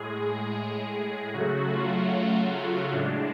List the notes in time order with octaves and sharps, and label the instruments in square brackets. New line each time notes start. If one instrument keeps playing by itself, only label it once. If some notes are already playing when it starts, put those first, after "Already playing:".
Already playing: [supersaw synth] A2 G#3 G#4
C#3 F#3 A3 F#4
F4
A2 G#3 D4